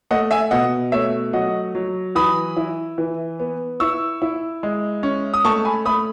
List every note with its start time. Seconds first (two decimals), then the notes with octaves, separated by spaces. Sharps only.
0.11 A3 D#5 F#5
0.31 E5 G#5
0.51 B2 D#5 F#5
0.92 A3 C#5 E5
1.33 F#3 D#5 F#5
1.75 F#3
2.15 E3 B5 D#6
2.57 E4
2.98 E3
3.39 B3
3.80 E4 C#6 E6
4.22 E4
4.63 G#3
5.03 C#4
5.34 D#6
5.45 A3 A5 C#6
5.65 G#5 B5
5.86 A3 B5 D#6